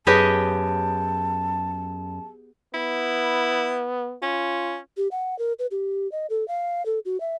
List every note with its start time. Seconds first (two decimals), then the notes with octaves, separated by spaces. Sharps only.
0.07 F#2 B3 G4 G#4 C#5 D#5 A5
2.74 B3 E4
4.22 C#4 F4
4.97 G4
5.11 F#5
5.39 A#4
5.59 B4
5.71 G4
6.12 D#5
6.30 A4
6.48 F5
6.86 A4
7.05 F#4
7.20 E5